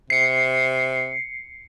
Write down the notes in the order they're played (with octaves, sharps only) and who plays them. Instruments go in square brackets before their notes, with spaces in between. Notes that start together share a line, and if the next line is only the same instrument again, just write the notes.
[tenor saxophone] C3 [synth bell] C7 C#7